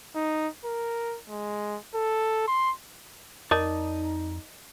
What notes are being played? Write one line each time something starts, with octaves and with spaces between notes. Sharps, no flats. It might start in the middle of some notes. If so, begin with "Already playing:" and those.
D#4
A#4
G#3
A4
C6
F2 D#4 A#4 D5 D#5 A5